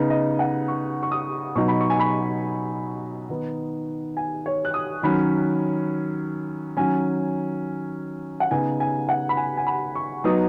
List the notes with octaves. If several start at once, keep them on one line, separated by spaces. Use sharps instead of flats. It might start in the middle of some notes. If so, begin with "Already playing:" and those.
Already playing: C#3 B3 D#4
D#5
F#5
C#6
C#6
D#6
B2 F#3 D#4 C#6
B5
C#6
G#5
B5
D#3 B3 D#4
G#5
C#5
F#6
D#6
D#3 F#3 C#4 B5
D#3 F#3 C#4 G#5
F#5
C#3 B3 D#4 G#5
G#5
F#5
B5
G#5
G#5
B5
C#6
F#3 B3 D#4 D#6